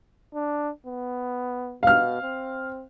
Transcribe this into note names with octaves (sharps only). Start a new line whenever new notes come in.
D4
B3
B2 F5 F6
C4